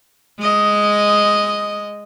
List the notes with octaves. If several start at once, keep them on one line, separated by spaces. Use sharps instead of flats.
G#3 D#5